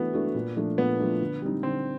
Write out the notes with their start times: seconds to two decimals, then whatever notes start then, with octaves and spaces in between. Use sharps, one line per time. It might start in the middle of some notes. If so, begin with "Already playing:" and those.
Already playing: E3 A3 B3 D4 F#4
0.13 A3 D4 F#4
0.35 A#2
0.56 F3 A3 D4
0.77 A#2 B3
0.99 F3 A3 D4
1.21 D3
1.42 G3 C4 D#4
1.63 D3 C4